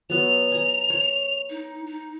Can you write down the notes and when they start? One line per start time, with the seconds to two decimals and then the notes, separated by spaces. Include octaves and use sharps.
0.10 F#3 B3 F7
0.52 G#5 A#5
0.90 C#5
1.50 D#4
1.87 D#4